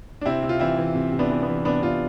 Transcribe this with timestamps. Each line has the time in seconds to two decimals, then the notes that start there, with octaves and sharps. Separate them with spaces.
0.21 D4
0.25 C3 C4 E4
0.43 C3
0.49 F4
0.60 E3 C4 E4
0.77 E3
0.95 C3
1.12 C3
1.19 B3 D4
1.30 E3
1.42 B3
1.48 E3
1.65 C3 B3 D4
1.82 C3 D4 F4